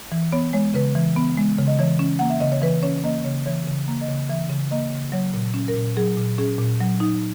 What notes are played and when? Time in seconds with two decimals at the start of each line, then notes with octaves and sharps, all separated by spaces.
0.12 E3
0.32 B3 C#5
0.53 G#3 C#5
0.74 C#3 B4
0.95 E3
1.16 B3
1.38 G#3
1.59 C#3
1.67 D#5
1.79 E3 C#5
1.99 C#4
2.19 A#3 F#5
2.30 E5
2.40 C#3 D#5
2.52 C#5
2.62 E3 B4
2.83 C#4 C#5
3.04 A#3 D#5
3.24 C#3 C#5
3.46 E3 C#5
3.67 C#3
3.88 A#3
4.01 D#5
4.08 C#3
4.29 E3 E5
4.50 C#3
4.71 A#3 D#5
4.93 C#3
5.12 F#3 C#5
5.34 A#2
5.54 C#4
5.68 A#4
5.76 A#2
5.97 F#3 G#4
6.17 A#2
6.38 C#4 G#4
6.58 A#2
6.80 F#3
7.00 D#4